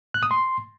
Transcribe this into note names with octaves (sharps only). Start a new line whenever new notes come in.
F#6
D#6
C6